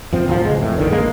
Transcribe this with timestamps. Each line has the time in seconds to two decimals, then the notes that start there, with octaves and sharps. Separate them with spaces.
0.13 F#2 F3 C4
0.28 D2 A2 F3
0.45 C#2 G#3
0.59 F2 A2 E3
0.76 A#1 D3 D#3
0.90 A1 G#3 A#3